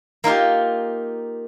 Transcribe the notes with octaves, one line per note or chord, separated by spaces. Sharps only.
A#3 D#4 F4 G4